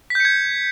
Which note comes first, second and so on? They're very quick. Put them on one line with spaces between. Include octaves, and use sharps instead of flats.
B6 G6 C#7 G#6